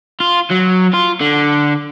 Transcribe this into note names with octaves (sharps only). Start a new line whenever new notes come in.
F4
F#3
F4
D3